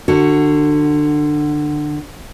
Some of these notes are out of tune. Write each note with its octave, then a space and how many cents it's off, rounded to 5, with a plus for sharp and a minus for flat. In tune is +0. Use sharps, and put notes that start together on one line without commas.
D3 +25 F#4 +0